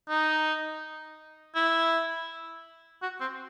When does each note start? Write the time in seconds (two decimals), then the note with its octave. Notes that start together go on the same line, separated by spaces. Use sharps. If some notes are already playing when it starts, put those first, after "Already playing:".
0.09 D#4
1.55 E4
3.02 F#4
3.20 C4